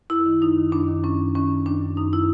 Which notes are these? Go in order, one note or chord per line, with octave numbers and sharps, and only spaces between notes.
F#2 E4
D#3
F#2 D#4
D#3
F#2 D4
D#3
F#2 C#4
D#3
D#3 C#4
F#2
D#3 D4
F#2
F#2 D#4
E4